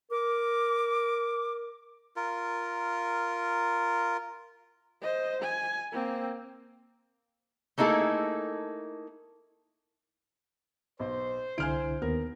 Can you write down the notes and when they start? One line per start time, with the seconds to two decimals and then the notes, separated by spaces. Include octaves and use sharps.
0.11 A#4 D6
2.16 F4 A#4
5.02 C5 D#5
5.42 G#5
5.92 A#3 C4
7.78 A3 A#3 D#4 E4 G#4 A4
11.00 B1 C5
11.58 C2 D3 E4 G#5 F6 D7
12.02 D#2 B3 A#4